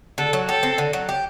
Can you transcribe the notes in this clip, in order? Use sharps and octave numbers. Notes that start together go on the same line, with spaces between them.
D3 A4
F#3
G4 A4
C4
D3
F#3
G4